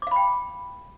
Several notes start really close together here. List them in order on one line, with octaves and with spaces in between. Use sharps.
D6 F5 B5 G5